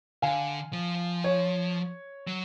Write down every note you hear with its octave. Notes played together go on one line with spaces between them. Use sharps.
D3 F5 G#5
F3
C#5
F#3